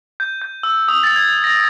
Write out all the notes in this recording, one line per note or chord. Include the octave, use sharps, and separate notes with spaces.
G6
G6
E6
D#6
A6
G#6
A#6